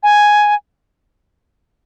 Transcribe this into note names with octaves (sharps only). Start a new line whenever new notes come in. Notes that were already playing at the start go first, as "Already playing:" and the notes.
G#5